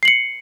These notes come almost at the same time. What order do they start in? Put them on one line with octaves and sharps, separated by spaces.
C7 F#7 C#7